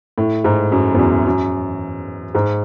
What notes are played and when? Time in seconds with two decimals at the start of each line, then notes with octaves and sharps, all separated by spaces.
0.18 A2
0.44 G#2
0.72 F#2
0.94 E2
0.99 F#2
1.27 F#2
2.35 G#2